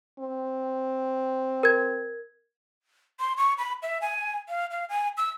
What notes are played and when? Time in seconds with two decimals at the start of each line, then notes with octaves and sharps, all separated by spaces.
0.19 C4
1.63 A#4 G#6
3.20 C6
3.37 C#6
3.58 B5
3.82 E5
4.01 G#5
4.49 F5
4.71 F5
4.89 G#5
5.17 E6